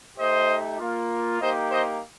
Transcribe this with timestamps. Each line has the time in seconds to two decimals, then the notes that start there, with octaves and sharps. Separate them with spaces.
0.18 A3 D#4 G4 C5 D#5
0.79 A#3 F4
1.40 A#3 D#4 G4 C5 D#5
1.71 C5 D#5